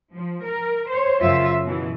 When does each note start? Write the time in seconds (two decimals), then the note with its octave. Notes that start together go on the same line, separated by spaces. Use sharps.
0.13 F3
0.45 A#4
0.89 C5 C#5
1.22 F#2 C#3 F4 E5
1.65 B2 E3